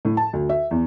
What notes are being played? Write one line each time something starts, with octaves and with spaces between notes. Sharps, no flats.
A2
A5
D2
E5
E2